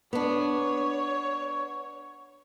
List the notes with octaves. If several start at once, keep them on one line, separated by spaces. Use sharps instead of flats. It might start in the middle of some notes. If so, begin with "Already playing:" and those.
B3 D4 C#5